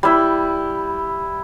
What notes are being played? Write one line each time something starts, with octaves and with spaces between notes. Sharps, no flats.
G3 E4